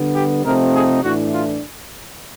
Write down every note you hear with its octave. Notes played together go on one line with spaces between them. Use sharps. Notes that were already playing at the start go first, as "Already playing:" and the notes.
Already playing: D3 G3 B3
G4
C3 F3 A3 C4 D#4 A#4
G#4
A2 E3 A3 D4 F#4
F4